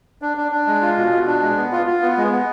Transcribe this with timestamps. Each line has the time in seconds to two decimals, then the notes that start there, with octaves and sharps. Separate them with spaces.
0.22 D4
0.37 D4
0.52 D4
0.67 G#3
0.82 F4
0.97 B2
1.12 B2
1.27 D4
1.42 G#3
1.57 B3
1.72 F4
1.87 F4
2.02 B3
2.17 G#3
2.31 B3